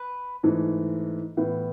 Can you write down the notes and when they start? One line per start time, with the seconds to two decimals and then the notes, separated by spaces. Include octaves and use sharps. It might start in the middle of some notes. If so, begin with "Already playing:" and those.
Already playing: B4
0.43 G#2 E3 A3
1.37 A2 E3 B3